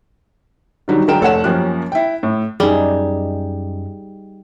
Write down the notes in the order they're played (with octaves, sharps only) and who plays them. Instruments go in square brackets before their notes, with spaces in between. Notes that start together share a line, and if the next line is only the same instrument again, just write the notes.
[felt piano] D3 D#3 F#3 G3 D#4
D3 F#3 G#3 A#4 G5 E7
F1 A4 C#5 F#5 E7
F#2 F3 A#3 C#4 G4 F#6
E4 G5
A2
[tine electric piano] F#2 [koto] G3 [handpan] D#4 G#4